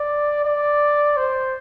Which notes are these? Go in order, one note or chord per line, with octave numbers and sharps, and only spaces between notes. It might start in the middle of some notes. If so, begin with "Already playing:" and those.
Already playing: D5
D5
C5